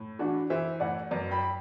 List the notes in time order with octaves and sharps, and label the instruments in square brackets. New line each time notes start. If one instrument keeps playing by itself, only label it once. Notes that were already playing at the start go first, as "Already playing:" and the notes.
Already playing: [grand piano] A2
[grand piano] E3 [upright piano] D4 F#4
[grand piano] E3 [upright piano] C5 E5
[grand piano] A2 [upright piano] D5 F#5
[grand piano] F#2 [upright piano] B4 D5
[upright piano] G5 B5
B5